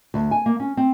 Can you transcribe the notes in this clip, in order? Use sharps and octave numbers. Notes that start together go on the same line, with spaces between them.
D2
G#5
A#3
C#4
C4